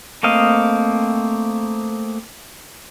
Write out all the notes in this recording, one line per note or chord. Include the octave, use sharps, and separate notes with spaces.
A3 A#3 C4 D#5 F5